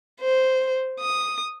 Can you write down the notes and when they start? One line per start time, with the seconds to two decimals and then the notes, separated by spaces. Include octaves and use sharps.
0.21 C5
1.00 D#6